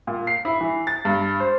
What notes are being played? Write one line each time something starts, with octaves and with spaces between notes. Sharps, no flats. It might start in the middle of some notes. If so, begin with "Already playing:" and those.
A#2
C7
E4
E3
A6
G2
C5